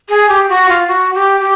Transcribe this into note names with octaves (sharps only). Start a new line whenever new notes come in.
G#4
G4
F#4
F4
F#4
G4
G4